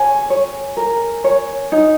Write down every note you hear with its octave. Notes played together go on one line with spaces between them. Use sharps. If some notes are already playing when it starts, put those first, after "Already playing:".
Already playing: C#5 G#5
C#5
A#4
C#5
D#4